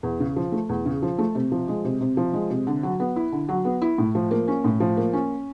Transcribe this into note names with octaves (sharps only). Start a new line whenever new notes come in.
E2
C#3
F3
A3
E2
C#3
F3
A3
C3
F3
G#3
C3
C3
F3
G#3
C3
D3
F#3
B3
E4
D3
F#3
B3
E4
A2
F3
A#3
C#4
A2
F3
A#3
C#4